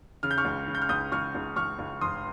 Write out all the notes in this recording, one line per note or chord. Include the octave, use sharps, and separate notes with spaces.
C#3 F6
G6
C#6 F6
C#2
C#3
G6
F6
C#2 D#6 G6
C#2 C#6 F6
C#2
C#2 C#6 F6
C#2
G1 C6 D#6